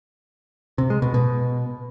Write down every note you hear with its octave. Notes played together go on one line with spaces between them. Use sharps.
C3
G#3
B2
B2